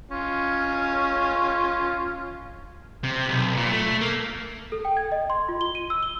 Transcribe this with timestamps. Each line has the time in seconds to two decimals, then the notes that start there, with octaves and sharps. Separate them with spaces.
0.11 C#4 F4
3.04 C3
3.29 B1
3.57 A#2
3.71 A3
4.01 A#3
4.72 A4
4.85 G5
4.97 G#6
5.12 D#5
5.30 C6
5.49 F4
5.61 G7
5.75 D#7
5.90 E6
6.03 G7